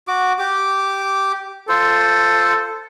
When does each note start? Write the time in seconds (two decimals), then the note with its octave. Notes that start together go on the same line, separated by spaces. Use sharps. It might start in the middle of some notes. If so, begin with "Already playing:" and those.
0.08 F#4 D6
0.39 G4 D6
1.69 F4 A4 C5